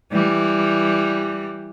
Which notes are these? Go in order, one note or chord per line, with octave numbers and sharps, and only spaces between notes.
E3 G3